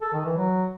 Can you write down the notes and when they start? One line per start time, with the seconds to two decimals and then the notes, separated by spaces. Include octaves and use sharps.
0.02 A4
0.13 D#3
0.25 E3
0.37 F#3